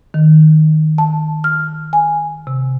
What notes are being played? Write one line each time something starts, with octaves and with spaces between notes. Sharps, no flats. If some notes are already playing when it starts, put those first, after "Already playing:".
D#3
A5
F6
G#5
C3